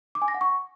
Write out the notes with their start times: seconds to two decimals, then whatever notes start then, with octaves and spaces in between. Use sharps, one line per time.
0.15 D6
0.22 G#5
0.28 A#6
0.34 F#5
0.41 C#6